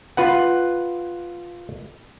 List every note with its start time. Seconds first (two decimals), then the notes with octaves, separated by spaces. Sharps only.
0.17 F4 B4 F#5